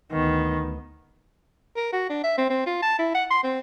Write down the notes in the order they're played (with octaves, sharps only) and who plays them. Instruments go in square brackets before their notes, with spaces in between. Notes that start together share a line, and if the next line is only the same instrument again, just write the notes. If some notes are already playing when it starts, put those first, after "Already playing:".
[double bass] D2 B3 [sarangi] D#3
[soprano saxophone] A#4
F#4
D4
E5
C4
C4
F4
A5
E4
F#5
C6
C4